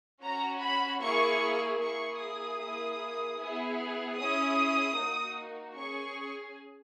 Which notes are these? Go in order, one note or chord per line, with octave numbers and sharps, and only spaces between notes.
C#4 F#4 A#5
B5
A#3 E4 G#4 C#6
A#3 E4 G#4 C#6
D#6
A#3 E4 G#4
B3 E4 G#4
C#4 E4 G#4 D#6
A#3 D#4 F#4
C#4 G#4 C#6